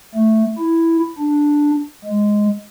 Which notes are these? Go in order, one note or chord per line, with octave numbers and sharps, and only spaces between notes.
A3
E4
D4
G#3